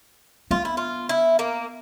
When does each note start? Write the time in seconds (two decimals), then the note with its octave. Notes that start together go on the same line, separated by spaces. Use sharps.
0.51 B3 F4
0.65 E4
0.77 F4
1.09 E4
1.39 A#3